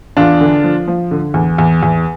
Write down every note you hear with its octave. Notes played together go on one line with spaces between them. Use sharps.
E2 D4 F4
D3
F3
F3
D3
E2
E2
E2